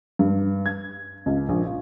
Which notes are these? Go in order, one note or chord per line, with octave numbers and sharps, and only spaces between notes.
G2
G#6
C#2
A#1
F4